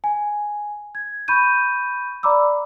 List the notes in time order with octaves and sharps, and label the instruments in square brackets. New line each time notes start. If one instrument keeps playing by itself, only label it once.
[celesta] G#5
G#6
B5 C#6 G6 D#7
D5 A#5 B5 D6 E6